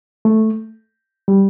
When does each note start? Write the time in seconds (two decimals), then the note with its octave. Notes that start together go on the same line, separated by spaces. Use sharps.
0.25 A3
1.28 G3